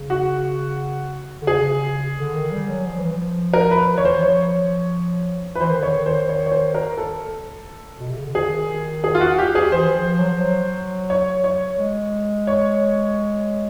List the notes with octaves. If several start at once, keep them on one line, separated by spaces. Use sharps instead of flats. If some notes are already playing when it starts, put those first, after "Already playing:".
Already playing: C#3
F#4
D3
C#3 G#4
D3
D#3
G3
F#3
F3
E3
F3
A#4
B4
D#3 C#5
C5
E3
F3 C#5
B4
E3 C5
D#3
D3 C#5
D#3
C5
C#5
C#5
C5
A#4
A4
B2
C3
C#3
D3
D#3 G#4
G#4
F4
F#4
G4
G#4
E3 C5
E3
F3
F#3
F3
F#3
C#5
C#5
G#3
C#5